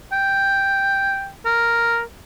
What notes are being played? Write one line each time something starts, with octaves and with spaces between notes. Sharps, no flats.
G5
A#4